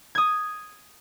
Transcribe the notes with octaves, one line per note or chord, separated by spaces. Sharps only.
D#6 G#6